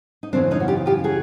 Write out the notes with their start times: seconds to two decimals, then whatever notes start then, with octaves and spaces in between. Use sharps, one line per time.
0.23 D#4
0.33 F#2 C#3 E3 C4 D4
0.51 C#4 D#4
0.60 F#4
0.68 F4 G4
0.86 F4 G4
1.04 F#4 G#4